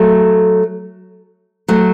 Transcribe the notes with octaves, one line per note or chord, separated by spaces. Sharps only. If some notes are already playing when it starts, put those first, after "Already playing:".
Already playing: F#3 A3
F#3 A3